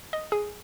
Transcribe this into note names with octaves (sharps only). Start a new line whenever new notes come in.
D#5
G#4